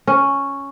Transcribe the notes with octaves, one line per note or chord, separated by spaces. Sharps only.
C#4